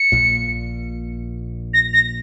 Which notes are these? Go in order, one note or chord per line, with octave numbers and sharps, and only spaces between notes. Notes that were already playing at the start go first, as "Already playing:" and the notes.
Already playing: C#7
A#1 A#2
A#6
A#6